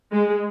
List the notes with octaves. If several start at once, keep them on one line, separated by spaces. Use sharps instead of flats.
G#3